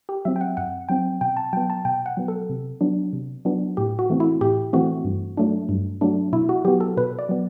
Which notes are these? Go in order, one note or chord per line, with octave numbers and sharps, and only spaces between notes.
G4
F#3 C4 E5
G5
F#5
F#2 F#5
F#3 C4 G5
B2 G5
A5
F#3 B3 G5
A5
B2 G5
F#5
F#3 B3
A4
C3
F#3 B3 D4
C3
F#3 B3 D4
A2 G4
F#4
E3 A3 C4
E4
A2 G4
E3 A3 C4 F#4
G2
F#3 A3 D4
G2
F#3 A3 D4
B2 E4
F#4
F#3 B3 G4
A4
B2 B4
D5
F#3 B3